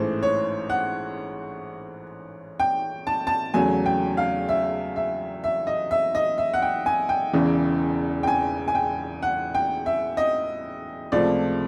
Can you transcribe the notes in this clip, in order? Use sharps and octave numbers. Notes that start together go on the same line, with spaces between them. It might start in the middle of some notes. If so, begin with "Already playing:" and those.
Already playing: A1 G#2 E3 A3 C5
C#5
F#5
G5
A5
A5
E2 C#3 F#3 A3 G#5
G5
F5
E5
E5
E5
D#5
E5
D#5
E5
F#5
G5
G#5
G5
E1 E2 C#3 E3
G5
G#5
G#5
G5
F#5
G5
E5
D#5
C#2 C3 F3 A3 D5